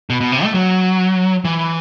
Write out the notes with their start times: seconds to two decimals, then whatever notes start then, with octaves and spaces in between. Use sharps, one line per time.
0.10 B2
0.21 B2
0.32 C3
0.44 A3
0.54 F#3
1.45 E3